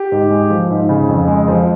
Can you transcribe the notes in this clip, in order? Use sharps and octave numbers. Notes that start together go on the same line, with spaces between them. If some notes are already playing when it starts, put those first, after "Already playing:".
Already playing: G4
G#2
G#3
F3
G#2
C#3
F2
G#3
F3